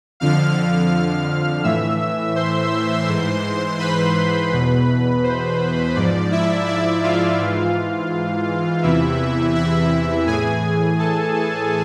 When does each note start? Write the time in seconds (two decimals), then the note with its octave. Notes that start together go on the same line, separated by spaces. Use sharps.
0.20 F2 D3 F3 F5 F6
1.64 A2 E3 E5 E6
2.36 C5 C6
3.08 G#2 E3
3.79 B4 B5
4.52 E2 B2 B4 B5
5.24 C5
5.95 G#2 F3 D5
6.31 E4 E5
6.67 D5
7.04 F4 F5
7.40 G#2 E3
8.83 E2 C3 E3 E4 E5
9.55 E4 E5
10.27 A2 E3 G#4 G#5
10.99 A4 A5
11.35 A4 A5